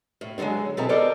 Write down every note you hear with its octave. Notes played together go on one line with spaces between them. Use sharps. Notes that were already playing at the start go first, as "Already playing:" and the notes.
A2
D3 D#3 F3 F#3 G#3
B2 C4 E4 G#4 A4 A#5
A4 A#4 C5 D5 D#5